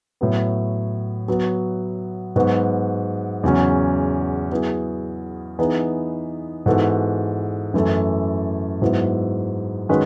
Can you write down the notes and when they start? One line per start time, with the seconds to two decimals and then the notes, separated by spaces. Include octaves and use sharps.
0.21 A2 F#3 B3
1.28 F#3 B3 F#4
2.36 G#2 F#3 B3 F#4 B4
3.43 E2 C#3 F#3 C#4
4.51 F#3 B3 E4 G#4
5.59 E3 B3 D#4 G#4
6.66 G#2 E3 B3 F#4 A4
7.74 F#2 E3 A3 E4 A4
8.82 G#2 F#3 B3 E4
9.89 D#3 G#3 C#4 F#4 B4